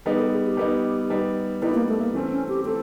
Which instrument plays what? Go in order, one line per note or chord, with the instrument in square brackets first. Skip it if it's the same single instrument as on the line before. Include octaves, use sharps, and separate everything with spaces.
[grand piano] G3 B3 D#4 [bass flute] G#4
[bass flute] A4
G#4
G4
[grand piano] G3 B3 D#4
G3 B3 D#4
[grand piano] G3 B3 D#4 [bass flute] E4
[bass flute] A#3
A3
A#3
[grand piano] E3 A3 C4 [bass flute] C#4
[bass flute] C#4
G4
[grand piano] E3 A3 C4 [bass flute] A4